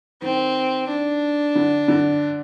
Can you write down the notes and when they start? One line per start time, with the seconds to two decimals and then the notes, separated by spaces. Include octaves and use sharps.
0.22 D#3 C4
0.88 D4
1.55 D3
1.88 D3